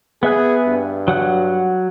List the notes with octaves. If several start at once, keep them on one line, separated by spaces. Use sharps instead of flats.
B3 G#4 E5 F#6
G2
F#3 F#5 F#6